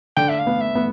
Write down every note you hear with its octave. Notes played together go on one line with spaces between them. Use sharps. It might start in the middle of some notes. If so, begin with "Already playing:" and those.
D3 G5
E5
F5
B3
E5
B3